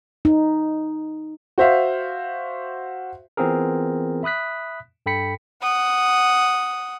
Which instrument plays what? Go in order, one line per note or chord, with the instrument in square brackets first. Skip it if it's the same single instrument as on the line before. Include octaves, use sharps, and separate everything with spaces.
[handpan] D#4
[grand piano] F#4 C5 E5 F5
[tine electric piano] E3 B3 C4 F4 G#4 A#4
E5 B5 D#6 F#6 B6
G2 A4 G5 B5 B6 C#7
[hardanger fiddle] F#5 D#6